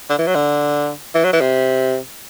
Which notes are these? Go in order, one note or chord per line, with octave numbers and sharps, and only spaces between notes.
D3
E3
F#3
D3
E3
F#3
E3
C3